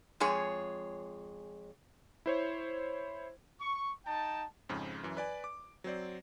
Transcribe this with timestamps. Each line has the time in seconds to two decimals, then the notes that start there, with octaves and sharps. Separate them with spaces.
0.20 F2 G#3 G#4 C#5
2.26 E4 C5 C#5
3.59 C#6
4.05 D#4 G5 A5
4.69 F2 G#2 C#3
5.03 F#2 E3
5.17 B4 D5 G#5
5.44 D6
5.84 F#3 C4 C5 D5